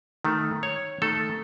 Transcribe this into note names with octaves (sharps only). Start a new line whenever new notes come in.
D#3 A3
C#5
D#3 A3 A4